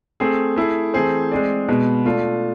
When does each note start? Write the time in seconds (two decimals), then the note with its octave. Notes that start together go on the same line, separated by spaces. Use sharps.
0.20 A3 C4 G#4
0.56 A3 E4 G#4
0.94 E3 A3 C4 G#4 C5
1.32 G#3 C4 G#4 D5
1.68 B2 G#3 B3
2.06 A3 D4 F4